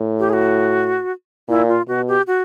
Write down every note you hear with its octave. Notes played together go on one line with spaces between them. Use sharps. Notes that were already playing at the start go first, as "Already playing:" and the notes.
Already playing: A2
G4
G#4
F#4
A#2 E4
F4
B2 F#4
G4
F#4